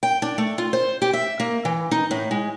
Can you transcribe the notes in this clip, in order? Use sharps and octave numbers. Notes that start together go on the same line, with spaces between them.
G5
D4
A3
F4
C5
G4
E5
A#3
E3
D#4
A2
G#3